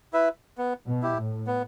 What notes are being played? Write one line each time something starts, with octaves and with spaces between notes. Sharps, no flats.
E4 B4 E5
B3
B2
E4 G4
A2
B3